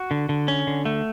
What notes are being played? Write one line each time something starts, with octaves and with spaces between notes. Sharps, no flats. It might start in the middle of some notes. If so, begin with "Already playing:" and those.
Already playing: F#4
D3
D3
C#4
D3
A3